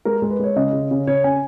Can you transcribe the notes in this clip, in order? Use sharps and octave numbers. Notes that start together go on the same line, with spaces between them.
G#3 A#4
G#3
B4
G#3 C#5
C#3 D#5
C#3
C#3
C#3 C#5
C#4 G#5